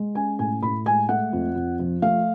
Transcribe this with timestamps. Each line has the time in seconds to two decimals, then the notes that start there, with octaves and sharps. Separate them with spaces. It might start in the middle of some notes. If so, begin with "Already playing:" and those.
Already playing: G#3
0.15 C#4 G#5
0.39 A2 G#5
0.62 A2 B5
0.86 G#3 G#5
1.09 A3 F#5
1.33 F2
1.56 F2
1.79 F3
2.02 A3 F5